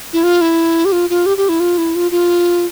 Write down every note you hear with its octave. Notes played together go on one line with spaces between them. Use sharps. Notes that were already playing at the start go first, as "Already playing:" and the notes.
E4
F4
E4
G4
F4
F4
G4
G4
E4
F4
E4
F4
F4